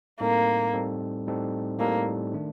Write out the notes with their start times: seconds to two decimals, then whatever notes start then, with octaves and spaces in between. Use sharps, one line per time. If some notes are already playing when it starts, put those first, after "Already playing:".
0.20 A2 G3 A#3 C4 D#4 A4
0.74 A2 G3 C4 D#4 A4
1.27 A2 G3 C4 D#4 A4
1.80 A2 G3 A#3 C4 D#4 A4
2.34 D#3 A3 D4